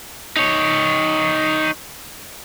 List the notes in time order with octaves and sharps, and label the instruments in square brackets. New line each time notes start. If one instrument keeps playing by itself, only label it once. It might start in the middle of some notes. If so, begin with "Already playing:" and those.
[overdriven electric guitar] D#4 C#5